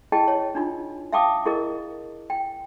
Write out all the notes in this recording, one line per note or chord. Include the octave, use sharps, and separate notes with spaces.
E4 G#4 D#5 G5 A5
C#5
D4 D#4 F4
E5 F5 G5 A5 D6 D#6
E4 G#4 A#4 D#5
G5